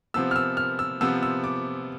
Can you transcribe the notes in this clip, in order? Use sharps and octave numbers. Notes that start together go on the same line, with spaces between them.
C3 F3 B3 E6
F6
E6
F6
E6
C3 F3 B3 E6
E6
D6